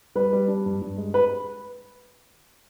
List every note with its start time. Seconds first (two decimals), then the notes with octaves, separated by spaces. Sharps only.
0.15 G3 B4
0.33 G3
0.48 D4
0.66 G2
0.82 G2
0.98 G#3
1.14 B4